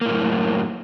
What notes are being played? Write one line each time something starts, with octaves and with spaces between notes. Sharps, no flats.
F#2 A2 A#3